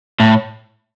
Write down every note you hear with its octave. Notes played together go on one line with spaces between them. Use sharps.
A2